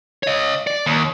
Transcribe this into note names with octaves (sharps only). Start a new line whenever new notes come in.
C#5 D#5
D5
D#2